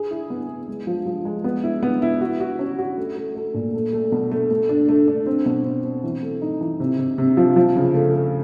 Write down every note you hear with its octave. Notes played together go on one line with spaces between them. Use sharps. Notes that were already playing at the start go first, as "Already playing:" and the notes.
Already playing: G#4
E4
B3
B3
G#3
F3
F3
G#3
B3
E4
B3
E4
F#4
F#4
C#4
F#4
A3
A3
A3
A#2
A3
A3
B2
A3
A3
D4
A3
D4
C4
B2
C4
C4
E3
A3
D#4
E3
C3
C3
C3
F3
F3
C#3
A3
A3